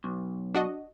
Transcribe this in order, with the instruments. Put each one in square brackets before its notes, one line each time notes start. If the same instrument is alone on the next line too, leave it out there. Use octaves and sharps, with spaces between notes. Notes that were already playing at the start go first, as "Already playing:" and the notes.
[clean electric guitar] B1
[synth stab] D4 F#4 D#5